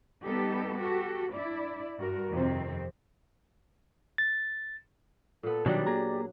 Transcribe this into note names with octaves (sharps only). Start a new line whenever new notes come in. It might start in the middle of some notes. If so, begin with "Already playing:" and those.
G3 B3 D#4 G4 A4
F#4 G4 A4
D4 E4 D5
G2 F#4 A#4
F2 C3 D#3 C4
A6
A#2 B3 A4
B2 D#3 F#3 G3 D4 G4 D5
A#3 G#4 A#5